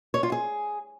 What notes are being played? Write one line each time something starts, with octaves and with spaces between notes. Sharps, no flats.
C#5
F4
G#4